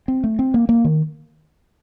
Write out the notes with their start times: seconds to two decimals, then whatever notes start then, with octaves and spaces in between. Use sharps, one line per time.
0.08 C4
0.24 A3
0.39 C4
0.54 A#3
0.69 A#3
0.84 D#3